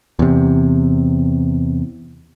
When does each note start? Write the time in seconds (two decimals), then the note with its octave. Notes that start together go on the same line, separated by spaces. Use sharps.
0.19 E2 C3